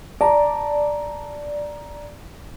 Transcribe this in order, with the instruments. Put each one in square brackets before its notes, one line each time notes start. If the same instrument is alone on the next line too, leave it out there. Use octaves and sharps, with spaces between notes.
[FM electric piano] D5 [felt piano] A5 A#5